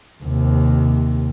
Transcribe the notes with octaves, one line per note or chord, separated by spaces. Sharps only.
D#2 C3